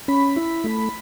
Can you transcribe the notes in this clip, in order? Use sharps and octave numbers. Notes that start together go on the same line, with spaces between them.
C#4 B5
E4
A3